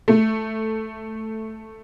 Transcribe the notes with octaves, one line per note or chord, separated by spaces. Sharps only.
A3